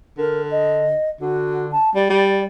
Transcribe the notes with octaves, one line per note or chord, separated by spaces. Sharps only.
D3 A#4
D#5
D3 F#4
A5
G3 D5
G3